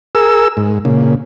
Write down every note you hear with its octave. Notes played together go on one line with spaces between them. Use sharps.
G#4 A#4 E6
G#2
A#2 C#3